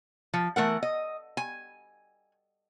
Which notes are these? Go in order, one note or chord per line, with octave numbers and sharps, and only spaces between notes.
F3
E3 A3 A#4 F#5
D#5
G#5